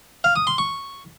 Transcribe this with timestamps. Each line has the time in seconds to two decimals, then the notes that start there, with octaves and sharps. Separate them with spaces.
0.24 F5
0.36 D#6
0.47 C6
0.58 C#6